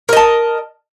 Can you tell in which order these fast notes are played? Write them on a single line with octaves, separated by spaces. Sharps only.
A#4 D#5 A5